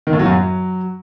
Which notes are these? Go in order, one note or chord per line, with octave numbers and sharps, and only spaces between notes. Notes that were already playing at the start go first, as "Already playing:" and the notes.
D#3
A2
F#3
F#2
F#3